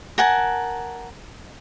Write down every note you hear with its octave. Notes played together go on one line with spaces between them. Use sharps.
A#4 F#5 G#5 A5